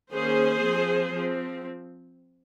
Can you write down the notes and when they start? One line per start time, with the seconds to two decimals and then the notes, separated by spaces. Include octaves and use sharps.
0.12 D#3 A#3 C#4 G#4 C5
0.63 F3 C4
1.14 F3 C4